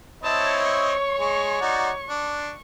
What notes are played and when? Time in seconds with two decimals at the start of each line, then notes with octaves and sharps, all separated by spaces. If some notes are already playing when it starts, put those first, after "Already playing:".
0.24 C4 E4 C#5 D#5 A5
0.64 C#6
1.19 G#3
1.61 D#4 F#4 D5
2.09 D4